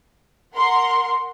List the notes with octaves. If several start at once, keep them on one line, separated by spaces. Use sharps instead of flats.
A#4 F#5 C6